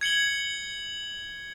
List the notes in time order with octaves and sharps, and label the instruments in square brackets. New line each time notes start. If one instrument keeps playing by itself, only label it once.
[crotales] G#6 C#7 F#7 G7